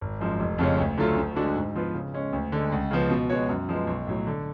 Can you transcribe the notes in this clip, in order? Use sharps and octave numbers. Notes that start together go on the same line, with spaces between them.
G#1
F#2 F3 G#3
F1
F2 C#3 G#3 C#4
D2
D3 F#3 A3 F4
D2
D3 G#3 D4 F#4
G#2
F3 B3 F4 B4
C#3
G#3 C#4
D2
D3 G#3
C#2
C#3 F3 B3
B2
G#3 B3 F#4 C#5
F#2
F3 G#3 B3
B1
A2 F#3
D3